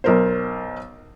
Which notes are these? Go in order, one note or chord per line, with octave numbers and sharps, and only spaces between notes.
B1 A#4 C5